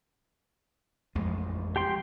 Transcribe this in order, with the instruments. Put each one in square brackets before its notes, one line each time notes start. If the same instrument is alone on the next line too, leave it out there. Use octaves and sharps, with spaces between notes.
[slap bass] A1 F2 G#3
[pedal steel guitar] G4 G5 C6